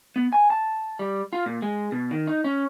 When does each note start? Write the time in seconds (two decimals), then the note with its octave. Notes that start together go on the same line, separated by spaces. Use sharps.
0.16 B3
0.33 G#5
0.50 A5
0.99 G3
1.33 F4
1.46 A#2
1.62 G#3
1.92 B2
2.11 D#3
2.28 D#4
2.44 C#4